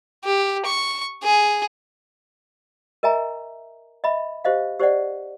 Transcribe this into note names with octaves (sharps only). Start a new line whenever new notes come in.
G4
C#6
G#4
A#4 D#5 E5 G#5 A#5
D#5 E5 B5
G4 C5 D#5 F5
G4 C5 D5 D#5 F#5